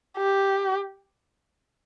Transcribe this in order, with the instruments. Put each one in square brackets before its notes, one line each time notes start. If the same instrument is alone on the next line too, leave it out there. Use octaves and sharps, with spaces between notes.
[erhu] G4